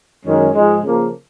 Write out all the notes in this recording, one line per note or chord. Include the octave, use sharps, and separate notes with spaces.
F#2 D#3 G#3 C#4
G#2 F3 G#3
C#3 F3 A#3